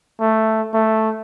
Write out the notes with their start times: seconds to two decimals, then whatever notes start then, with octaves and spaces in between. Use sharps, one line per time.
0.21 A3
0.74 A3